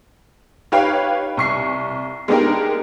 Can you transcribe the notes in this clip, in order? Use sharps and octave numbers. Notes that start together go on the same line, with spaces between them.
D#4 G4 B4 C#5 F5 G5
C2 C#6 C7
G#3 B3 D4 D#4 G4 A#4